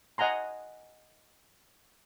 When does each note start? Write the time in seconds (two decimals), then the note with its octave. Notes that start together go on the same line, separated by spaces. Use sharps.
0.18 D#5 F#5 G#5 A#5 C6